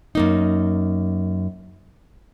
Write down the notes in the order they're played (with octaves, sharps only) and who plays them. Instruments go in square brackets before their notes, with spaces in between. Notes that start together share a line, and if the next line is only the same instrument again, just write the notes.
[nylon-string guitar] F#2 A#3 D#4